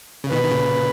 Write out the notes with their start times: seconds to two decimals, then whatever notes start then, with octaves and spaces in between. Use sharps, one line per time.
0.24 C#3
0.31 B2 D#3 B4
0.44 D#3
0.51 A#2 C#3